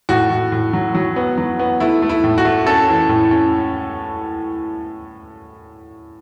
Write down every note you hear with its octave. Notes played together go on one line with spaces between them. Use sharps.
A2 F#4
A2
A2
F#3
F#3
B3
F#3
B3
A3 E4
A3
E4
A2
F#4
A3
C#4 A4
E3
A2
C#4